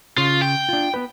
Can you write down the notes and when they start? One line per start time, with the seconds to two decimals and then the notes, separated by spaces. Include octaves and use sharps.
0.18 C#3 F4
0.42 G5
0.69 D4 F4
0.94 B3 B4